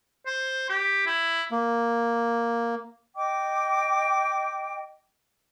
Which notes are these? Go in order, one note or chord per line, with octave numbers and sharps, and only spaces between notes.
C5
G4
E4
A#3
D#5 G5 D6